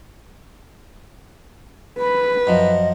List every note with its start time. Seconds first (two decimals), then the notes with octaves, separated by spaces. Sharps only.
1.99 B4 B5
2.47 F#2 F3 D#5